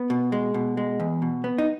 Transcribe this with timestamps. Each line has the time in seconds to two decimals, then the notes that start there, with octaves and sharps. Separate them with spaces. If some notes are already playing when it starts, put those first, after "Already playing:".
Already playing: B3
0.10 B2
0.32 G#3
0.54 B2
0.77 G#3
1.00 E2
1.22 B2
1.44 B3
1.58 D#4